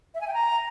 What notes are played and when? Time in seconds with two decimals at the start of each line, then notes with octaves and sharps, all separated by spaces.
0.14 E5
0.21 G#5
0.27 G5
0.34 A#5